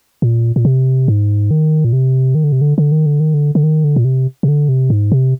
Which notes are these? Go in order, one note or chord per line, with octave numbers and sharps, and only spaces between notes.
A#2
A#2
C3
G#2
D#3
A#2
C3
D#3
D3
C3
D3
D3
D#3
D3
D#3
D3
D3
D#3
D3
A#2
C3
C3
D3
C3
G#2
C3